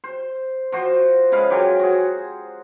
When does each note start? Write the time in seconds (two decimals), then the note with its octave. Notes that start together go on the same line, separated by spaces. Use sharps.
0.04 C5
0.72 F3 F#4 C5
1.32 C#3 G#3 B4 F5
1.50 F#3 G4 C5 G#5
1.80 F#4 G#4